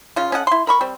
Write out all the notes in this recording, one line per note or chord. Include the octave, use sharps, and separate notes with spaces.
C#3 C#4 F4
C#4 A4 D#5 F#5
E4 C6
A#4 B5 C#6
G3 C4